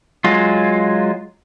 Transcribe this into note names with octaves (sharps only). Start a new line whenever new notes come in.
F#3 G#3 F4